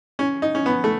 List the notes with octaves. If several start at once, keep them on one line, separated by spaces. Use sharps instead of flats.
C#4
D#4
C#4
B3
A3